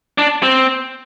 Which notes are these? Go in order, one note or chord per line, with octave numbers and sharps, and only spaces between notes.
D4
C4